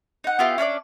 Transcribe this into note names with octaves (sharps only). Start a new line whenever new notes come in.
D#4 F#5
B3 E4 F4 G4
C#4 D4 A#4 D5